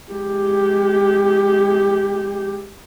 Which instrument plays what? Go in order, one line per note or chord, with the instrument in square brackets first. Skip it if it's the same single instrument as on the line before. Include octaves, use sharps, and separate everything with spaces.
[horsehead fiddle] G#3 G4